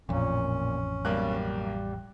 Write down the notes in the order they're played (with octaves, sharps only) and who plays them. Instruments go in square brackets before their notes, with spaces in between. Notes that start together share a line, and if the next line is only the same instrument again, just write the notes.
[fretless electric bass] A1 F2 [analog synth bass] A#2 [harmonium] C#4
[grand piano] B1 A#3 F#6 [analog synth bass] G3